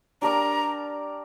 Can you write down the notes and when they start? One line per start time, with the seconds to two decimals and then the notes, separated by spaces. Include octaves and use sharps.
0.22 D4 G4 A#4 D5 A#5